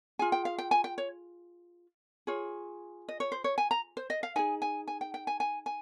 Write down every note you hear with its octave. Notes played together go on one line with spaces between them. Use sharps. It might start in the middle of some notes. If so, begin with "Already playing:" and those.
F4 G#4 G#5
G5
F5
G5
G#5
G5
C#5
F4 G#4 C#5
D#5
C#5
C5
C#5
G#5
A#5
C5
D#5
F5
D#4 G#4 G#5
G#5
G#5
G5
G5
G#5
G#5
G#5